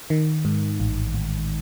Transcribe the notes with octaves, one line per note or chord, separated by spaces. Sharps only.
D#3
G#2
A1
A1